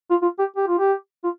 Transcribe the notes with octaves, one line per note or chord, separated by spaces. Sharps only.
F4
F4
G4
G4
F4
G4
F4